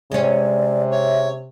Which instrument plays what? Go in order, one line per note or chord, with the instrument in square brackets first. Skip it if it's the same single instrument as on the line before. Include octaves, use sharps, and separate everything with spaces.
[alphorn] C3 [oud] G#3 C#4 [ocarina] D5
[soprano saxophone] C#5 [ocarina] E5